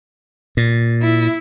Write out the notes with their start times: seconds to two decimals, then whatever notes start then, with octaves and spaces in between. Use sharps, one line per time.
0.57 A#2
1.02 E4